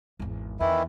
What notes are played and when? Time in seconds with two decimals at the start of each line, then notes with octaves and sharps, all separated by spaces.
0.19 G#1 E2
0.60 E2 D#3 E3 E4 E5